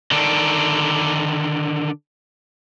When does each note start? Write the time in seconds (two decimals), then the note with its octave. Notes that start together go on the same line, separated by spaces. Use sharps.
0.11 D3 D#3 D4